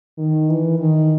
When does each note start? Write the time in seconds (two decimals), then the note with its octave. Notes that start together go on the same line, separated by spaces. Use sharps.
0.18 D#3
0.49 E3
0.80 D#3